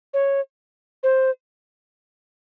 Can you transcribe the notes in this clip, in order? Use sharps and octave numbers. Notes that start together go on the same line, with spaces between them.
C#5
C5